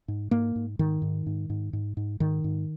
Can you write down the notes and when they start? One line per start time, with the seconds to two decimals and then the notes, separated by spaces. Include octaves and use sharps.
0.08 G#2
0.31 G#2 A#3
0.56 G#2
0.79 G#2 D#3
1.02 G#2
1.26 G#2
1.50 G#2
1.73 G#2
1.97 G#2
2.20 G#2 D#3
2.44 G#2